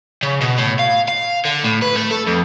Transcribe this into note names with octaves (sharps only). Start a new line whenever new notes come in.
C#3
B2
A2
F5
F5
D3
A2
B4
A3
A4
F2